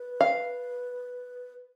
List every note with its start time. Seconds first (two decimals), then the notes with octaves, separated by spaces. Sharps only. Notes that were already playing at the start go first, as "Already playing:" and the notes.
Already playing: B4
0.21 F5